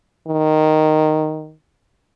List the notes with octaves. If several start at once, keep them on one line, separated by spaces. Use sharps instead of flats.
D#3